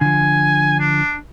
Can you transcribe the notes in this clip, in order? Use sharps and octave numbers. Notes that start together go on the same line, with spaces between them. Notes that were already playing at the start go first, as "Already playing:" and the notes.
D3 F3 G#5
D4